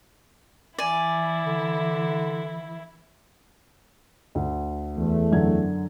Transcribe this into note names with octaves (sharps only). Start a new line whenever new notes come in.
E3 E4 D5 G#5
D3
D2
E2 A3
F#2 D3 G#6